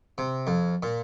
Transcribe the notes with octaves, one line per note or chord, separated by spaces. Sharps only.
C3
F2
A#2